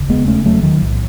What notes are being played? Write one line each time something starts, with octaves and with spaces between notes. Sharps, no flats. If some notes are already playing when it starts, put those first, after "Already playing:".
Already playing: E1 D#2 C#3
G#3 B3
A3 C#4
F#3 A3
D#3 F#3
B1 A2